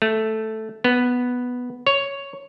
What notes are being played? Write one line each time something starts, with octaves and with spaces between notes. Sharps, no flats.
A3
B3
C#5